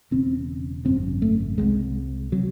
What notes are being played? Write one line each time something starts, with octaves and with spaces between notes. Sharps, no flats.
E1 E2 C#3 C4
G#1 F#2 C#3 C4
A3
C2 C3 G#3
C3 F#3